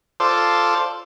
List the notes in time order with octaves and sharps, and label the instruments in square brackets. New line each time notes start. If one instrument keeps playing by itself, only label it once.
[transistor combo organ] F4 A4 C5 D5